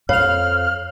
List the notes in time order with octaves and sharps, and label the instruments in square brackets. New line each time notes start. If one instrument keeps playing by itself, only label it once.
[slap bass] F2 [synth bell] C#5 F7 [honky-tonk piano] F5 [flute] F6